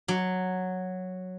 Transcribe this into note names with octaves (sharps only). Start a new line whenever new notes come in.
F#3